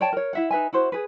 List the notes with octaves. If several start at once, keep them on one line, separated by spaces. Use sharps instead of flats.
C#5 D5 G5 A5
A#4 C#5
E4 E5 F#5
D#4 B4 E5 G#5
E4 F#4 C5
G#4 B4